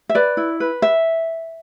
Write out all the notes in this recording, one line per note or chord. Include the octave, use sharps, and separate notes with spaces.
E5
B4 D5
E4
B4
E5